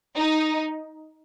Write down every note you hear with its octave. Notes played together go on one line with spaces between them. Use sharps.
D#4